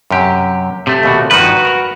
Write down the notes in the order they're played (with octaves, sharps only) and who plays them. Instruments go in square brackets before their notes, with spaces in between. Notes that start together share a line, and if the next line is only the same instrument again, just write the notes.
[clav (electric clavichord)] F#2 C3 G4
[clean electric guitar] C3 A3
[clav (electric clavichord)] D#2 B2 F#4
[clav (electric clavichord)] G2 D#3 F3 [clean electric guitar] F#4 B4
[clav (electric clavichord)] A#4 F#5